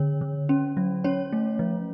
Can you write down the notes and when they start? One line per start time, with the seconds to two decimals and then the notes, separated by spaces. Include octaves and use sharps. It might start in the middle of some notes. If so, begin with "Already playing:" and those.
Already playing: D3 C#5
0.21 D3
0.49 C#4
0.77 F#3
1.04 C#4 C#5
1.33 A3
1.59 F3